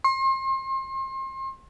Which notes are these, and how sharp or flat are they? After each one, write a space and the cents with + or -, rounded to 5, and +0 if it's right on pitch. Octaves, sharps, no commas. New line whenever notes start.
C6 +35